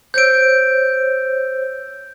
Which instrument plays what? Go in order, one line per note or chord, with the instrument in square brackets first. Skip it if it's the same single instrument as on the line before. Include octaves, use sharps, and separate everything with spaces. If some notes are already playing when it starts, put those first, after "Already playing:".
[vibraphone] C5 C#5 E6 [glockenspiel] G6 D7